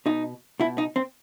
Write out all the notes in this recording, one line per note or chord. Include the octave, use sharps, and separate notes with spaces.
B2 D#4
B2 E4
D#4
C4